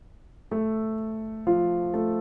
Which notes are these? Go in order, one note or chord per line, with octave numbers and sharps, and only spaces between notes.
A3 A4
F3 F4
A3 A4